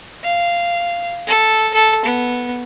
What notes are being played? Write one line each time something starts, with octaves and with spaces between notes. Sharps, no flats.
F5
A4
A4
B3